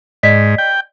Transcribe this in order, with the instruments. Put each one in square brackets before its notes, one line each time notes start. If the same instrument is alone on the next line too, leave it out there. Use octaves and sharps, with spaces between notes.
[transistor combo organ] G#2 [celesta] D5 D#5 B6
[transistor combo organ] G5